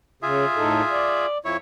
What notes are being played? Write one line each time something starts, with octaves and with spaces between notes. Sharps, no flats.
C#3 F4 G#4 E5
A2 D#4 A4
D5
F2 E4 C#5